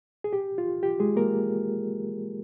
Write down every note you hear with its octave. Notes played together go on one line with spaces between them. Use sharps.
G#4
G4
F4
G4
G#3 G#4
A#3 A#4